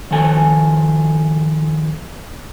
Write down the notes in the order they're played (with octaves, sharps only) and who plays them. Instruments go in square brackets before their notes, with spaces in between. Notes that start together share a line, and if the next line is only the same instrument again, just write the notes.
[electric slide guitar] D#3 F3 A4 G#5